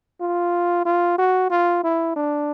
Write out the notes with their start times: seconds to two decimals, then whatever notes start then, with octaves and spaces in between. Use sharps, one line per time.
0.21 F4
0.85 F4
1.18 F#4
1.50 F4
1.84 E4
2.16 D4